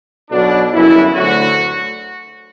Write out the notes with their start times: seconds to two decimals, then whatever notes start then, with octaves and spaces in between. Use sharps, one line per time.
0.31 B1 B2 F#3 D4
0.73 G1 F#2 C#3 E3 E4
1.15 D2 D3 F#3 F#4